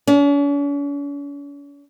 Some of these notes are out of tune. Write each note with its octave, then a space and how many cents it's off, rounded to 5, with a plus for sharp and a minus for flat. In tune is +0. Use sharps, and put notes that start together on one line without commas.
C#4 +45